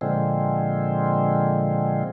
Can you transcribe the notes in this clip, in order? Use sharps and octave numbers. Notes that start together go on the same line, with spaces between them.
A#2 D3 F3 G#3 C4